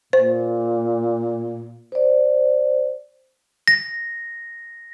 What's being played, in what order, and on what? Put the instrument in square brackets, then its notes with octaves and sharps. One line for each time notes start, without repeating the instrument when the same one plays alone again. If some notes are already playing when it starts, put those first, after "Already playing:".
[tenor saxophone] A#2 [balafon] C5
[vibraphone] C5 D5
[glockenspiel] A#6